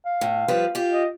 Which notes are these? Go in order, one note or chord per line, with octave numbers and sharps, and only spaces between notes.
F5
A2
F3 G3 B4
F4 G4
D#5